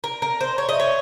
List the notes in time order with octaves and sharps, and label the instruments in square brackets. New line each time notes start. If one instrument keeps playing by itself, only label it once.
[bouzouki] A#4
A#4
C5
C#5
D#5
C#5